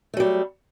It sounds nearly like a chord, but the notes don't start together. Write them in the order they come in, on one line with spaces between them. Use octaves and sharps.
A3 F#3 G3